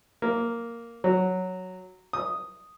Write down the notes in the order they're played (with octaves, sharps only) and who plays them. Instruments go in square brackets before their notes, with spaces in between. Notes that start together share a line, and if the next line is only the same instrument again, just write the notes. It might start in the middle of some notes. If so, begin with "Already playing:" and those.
[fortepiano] A#3
F#3
D#6